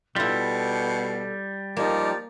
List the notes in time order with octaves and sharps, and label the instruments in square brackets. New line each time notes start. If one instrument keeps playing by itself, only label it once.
[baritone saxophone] B2 [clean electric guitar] G3 [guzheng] E4 F4 [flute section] A4
[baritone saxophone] F3 [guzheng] A#3 [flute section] D#4 G4 D5